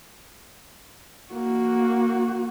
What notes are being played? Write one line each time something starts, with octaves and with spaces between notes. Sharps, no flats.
A#3 F#4